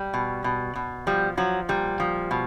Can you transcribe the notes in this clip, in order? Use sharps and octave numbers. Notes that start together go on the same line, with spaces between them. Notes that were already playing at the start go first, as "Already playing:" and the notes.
Already playing: G3
B2
B2
B2
F3 G3
F3 F#3
A#2 G3
F3
B2